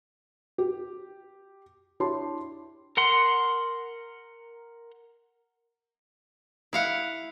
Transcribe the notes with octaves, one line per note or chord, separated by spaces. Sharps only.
G4
D4 E4 G4 C#5 A5 C6
A#4 F#5 C6
E4 F5 F#5